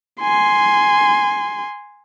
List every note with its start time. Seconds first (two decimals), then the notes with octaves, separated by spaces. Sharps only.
0.22 G#5 C6